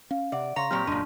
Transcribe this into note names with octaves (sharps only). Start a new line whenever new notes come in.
C#4 F5
C3 D5 E5 F#5
C#3 C#5 F5 A#5 C6 A#6
A#2 F#3 C4 G4 C#6 F6
E1 F#2 A#2 G#3 D4